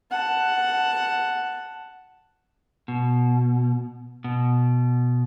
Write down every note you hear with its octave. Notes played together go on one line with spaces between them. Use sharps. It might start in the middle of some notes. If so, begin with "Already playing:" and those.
F#5 A5
B2
B2